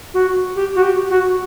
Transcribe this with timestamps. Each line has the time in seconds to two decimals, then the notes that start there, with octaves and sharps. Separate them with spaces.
0.13 F#4
0.55 G4
0.75 F#4
0.82 G4
1.09 F#4